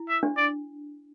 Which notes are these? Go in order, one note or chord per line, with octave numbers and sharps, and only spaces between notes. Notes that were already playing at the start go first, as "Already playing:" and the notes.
Already playing: E4
E5
D4
D5